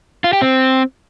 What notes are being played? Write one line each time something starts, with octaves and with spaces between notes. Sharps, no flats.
F4
G4
C4